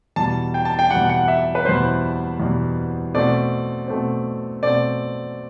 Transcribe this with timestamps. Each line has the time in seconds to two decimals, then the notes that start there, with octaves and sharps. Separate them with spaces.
0.16 E2 B2 G3 A5
0.54 G5
0.65 A5
0.79 G5
0.90 E2 B2 G3 F#5
1.10 F#5
1.28 E5
1.55 B4
1.65 E2 B2 G3 C5
2.40 E2 B2 G3
3.14 B2 A3 C4 D5
3.88 B2 A3 C4
4.63 B2 A3 C4 D5